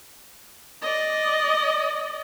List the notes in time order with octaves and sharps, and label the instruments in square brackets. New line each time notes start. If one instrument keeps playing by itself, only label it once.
[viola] D5 D#5